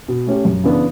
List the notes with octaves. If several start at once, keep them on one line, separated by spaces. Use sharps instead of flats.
B2
A3 C#4 G4
F#2
C#3 E3 B3 D4